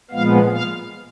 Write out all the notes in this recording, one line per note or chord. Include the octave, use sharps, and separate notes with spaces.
A#2 F3 G#3 B3 F5
F5